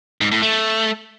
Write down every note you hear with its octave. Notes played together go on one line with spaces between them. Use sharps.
G#2
A2
A3